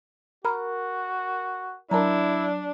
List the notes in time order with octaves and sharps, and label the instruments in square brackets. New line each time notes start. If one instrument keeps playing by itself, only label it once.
[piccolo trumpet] F#4 [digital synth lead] A#4 [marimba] A#5 B5 F6
[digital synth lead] F#3 [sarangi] D4 [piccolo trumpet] E4 [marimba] A#4 A5 A#5